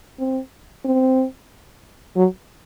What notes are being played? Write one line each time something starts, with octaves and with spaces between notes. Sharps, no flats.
C4
C4
F#3